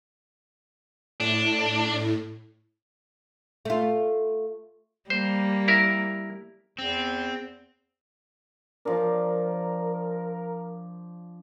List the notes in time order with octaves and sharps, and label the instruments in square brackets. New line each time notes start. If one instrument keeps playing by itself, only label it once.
[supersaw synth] A2 [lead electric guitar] D4
[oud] A3 F4
[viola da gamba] G3 A#3 [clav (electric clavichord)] C5
[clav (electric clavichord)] E4 A#4
[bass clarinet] E2 [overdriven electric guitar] C4
[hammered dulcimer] F3 D4 [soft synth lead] A#4